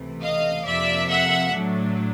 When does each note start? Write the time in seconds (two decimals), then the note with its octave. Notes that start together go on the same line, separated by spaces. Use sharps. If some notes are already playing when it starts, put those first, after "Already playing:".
Already playing: C#2 C3 E3 A3
0.21 D#5 F5
0.65 F2 C3 F3 A#3 D5 E5
1.09 E5 F#5
1.53 A2 F#3 A3 D4